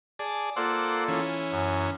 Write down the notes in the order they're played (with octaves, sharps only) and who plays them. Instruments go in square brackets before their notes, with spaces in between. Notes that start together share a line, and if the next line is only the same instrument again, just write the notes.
[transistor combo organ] G#4 D5 A5
[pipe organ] A#3 F4 A4 [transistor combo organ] C5 D5 F#5
[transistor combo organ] E3 C#4
[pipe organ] F#2